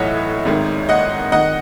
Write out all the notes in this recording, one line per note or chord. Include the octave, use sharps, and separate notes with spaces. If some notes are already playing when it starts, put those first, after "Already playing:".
Already playing: B1 A2 E3 C#5 D#5 E5 F#5
G#1 G#2 D#3
D#5 F#5
D#3 D#5 F#5